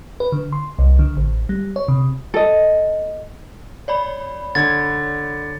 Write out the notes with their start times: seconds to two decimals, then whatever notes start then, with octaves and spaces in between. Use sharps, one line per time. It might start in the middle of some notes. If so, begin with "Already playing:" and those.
0.20 B4
0.32 D3
0.52 C6
0.79 C2
0.99 D3
1.17 A1
1.49 G3
1.76 C#5
1.88 C3
2.34 A4 D#5
3.88 C#5 D5 B5
4.55 D3 G#6 A6